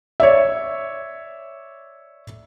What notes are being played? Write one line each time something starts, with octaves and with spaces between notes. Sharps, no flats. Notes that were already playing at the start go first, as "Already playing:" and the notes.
C#5 D5 E5